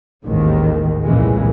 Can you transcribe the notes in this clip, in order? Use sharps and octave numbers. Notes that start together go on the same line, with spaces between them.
A1 D#2 G#2 D#3
C2 F2 A#2 C#3 E3 G#3